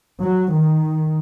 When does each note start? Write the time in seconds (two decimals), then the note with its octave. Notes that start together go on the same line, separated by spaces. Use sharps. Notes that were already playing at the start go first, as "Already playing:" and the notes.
0.23 F#3
0.54 D#3